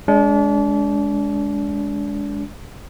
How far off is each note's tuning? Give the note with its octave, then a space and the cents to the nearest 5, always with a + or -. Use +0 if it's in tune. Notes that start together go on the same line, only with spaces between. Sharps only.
G#3 +0 D4 -35